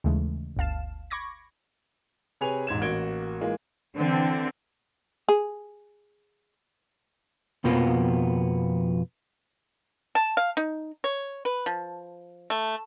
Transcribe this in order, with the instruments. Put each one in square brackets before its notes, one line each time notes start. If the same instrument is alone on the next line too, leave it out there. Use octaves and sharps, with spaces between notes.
[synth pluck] D#2 C#3 E3 G#3 A3
G1 D2 F5 A5 E7
B5 C#6 D6 G#6 A#6
[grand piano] C3 G#4 B4 C#5 G#5 F7
E1 G#2 G#6 E7
A1 A#3 F#4 G#6 D7 G7
E3 G#3 A#3 F4
[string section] D3 E3 C4
[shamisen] G#4
[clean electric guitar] F2 B2 F3 A#3 B3
[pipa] A5
F5
D#4
C#5
B4
F3
A3